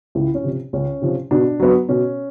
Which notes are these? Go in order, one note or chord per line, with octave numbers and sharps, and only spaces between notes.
C#2 E4
C#4
C3 F3
C#2 C#4
C3 F3
B2 D4
F#3 B3
B2 C#4